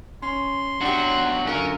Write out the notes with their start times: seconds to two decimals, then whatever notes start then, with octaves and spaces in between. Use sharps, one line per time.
0.22 C#4 C6
0.81 E2 F#3 D4 F#4 G4
1.47 F#2 D3 C#4 F4 A#4